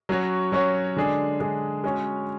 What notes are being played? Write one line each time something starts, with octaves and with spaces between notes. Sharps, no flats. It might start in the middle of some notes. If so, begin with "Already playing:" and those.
F#3 C#4 F#4 C#5
F#3 C#4 F#4 C#5
D3 G#3 D4 G#4
D3 G#3 D4 G#4
G#3 C#4 F#4 C#5